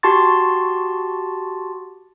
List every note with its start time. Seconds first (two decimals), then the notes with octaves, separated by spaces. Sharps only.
0.03 F#4 G4 A5 C6 C#6 A6